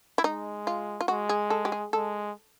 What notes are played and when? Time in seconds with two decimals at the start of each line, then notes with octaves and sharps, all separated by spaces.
0.18 E4
0.24 G#3 D#4
0.67 F4
1.01 F4
1.08 G#3 F#4
1.29 G#4
1.50 A4
1.65 G4
1.72 G#4
1.93 G#3 A4